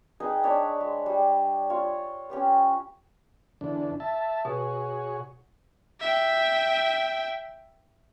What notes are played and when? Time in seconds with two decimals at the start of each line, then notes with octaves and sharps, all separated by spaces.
0.20 D#4 G#4 B4 G5
0.44 D4 C#5 B5
0.81 G#3
1.06 G3
1.70 F4 C#5
2.30 C#4 G4 B4
3.61 E2 D3 D4
4.00 E5 A5
4.45 B2 F#4 G#4 C#5
6.01 E5 G5